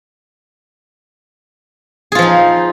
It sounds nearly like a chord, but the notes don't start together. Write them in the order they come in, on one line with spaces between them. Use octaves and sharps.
G#4 F4 F3 D#4